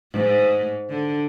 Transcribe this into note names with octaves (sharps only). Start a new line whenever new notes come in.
G#2
D3